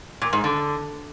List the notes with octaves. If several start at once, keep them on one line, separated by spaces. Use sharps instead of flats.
A#2
G#2
D3